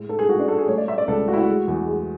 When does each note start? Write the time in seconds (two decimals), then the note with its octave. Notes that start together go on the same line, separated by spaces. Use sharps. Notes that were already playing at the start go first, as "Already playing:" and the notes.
Already playing: A2 G#3
0.09 G#2 A4
0.19 G#4
0.29 G#2 F#4
0.39 D4
0.48 G#3 A4
0.58 G#4
0.68 A3 C#5
0.78 D5
0.88 A3 E5
0.98 D5
1.08 C#2 A4
1.28 A3 F#4
1.33 E4
1.38 F#4
1.48 G#3
1.68 E2
1.87 G#3